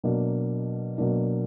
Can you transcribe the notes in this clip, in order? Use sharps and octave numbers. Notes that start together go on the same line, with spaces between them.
B2 F#3 A#3 D4
B2 F#3 A#3 D4